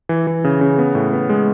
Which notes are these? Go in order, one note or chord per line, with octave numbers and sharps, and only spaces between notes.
E3
E3
C#3
C#3
B3
A2
B3
G#3